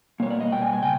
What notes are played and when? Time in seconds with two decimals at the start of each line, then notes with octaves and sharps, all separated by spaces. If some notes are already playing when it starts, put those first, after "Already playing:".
0.20 B2 G3 A#3 C#5
0.30 D5
0.41 D#5
0.52 B2 G3 G5
0.62 G#5
0.73 G#5
0.83 C#3 G5